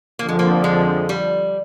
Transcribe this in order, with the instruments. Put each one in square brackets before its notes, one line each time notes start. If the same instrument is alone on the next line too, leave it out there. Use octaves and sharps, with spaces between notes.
[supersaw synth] F2 D3 F3 [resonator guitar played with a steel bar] A#3
[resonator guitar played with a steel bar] G#3
A#3
G#3
G3